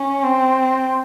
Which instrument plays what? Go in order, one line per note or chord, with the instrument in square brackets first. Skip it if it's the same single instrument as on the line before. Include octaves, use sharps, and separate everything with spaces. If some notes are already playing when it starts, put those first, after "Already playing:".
Already playing: [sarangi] C#4
C4